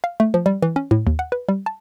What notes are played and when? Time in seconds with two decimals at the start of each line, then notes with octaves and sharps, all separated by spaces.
0.04 F5
0.20 A3
0.34 F3
0.46 G3
0.62 E3
0.76 C#4
0.91 A2
1.07 D#2
1.19 F#5
1.32 B4
1.49 G3
1.66 A5